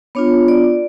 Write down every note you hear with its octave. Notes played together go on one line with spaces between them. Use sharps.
B3 D4 F4 C#5
D5